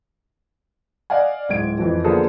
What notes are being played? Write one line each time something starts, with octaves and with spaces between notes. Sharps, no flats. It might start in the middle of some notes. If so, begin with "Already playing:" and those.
D5 D#5 F5 F#5 G#5
D1 G#2 G#3 G#6 D7
F2 E3 F3
D3 F3 A#3 B3 G#4 A4